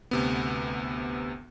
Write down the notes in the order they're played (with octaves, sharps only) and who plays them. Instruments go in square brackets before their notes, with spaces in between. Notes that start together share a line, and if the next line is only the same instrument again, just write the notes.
[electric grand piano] D2 C3 B3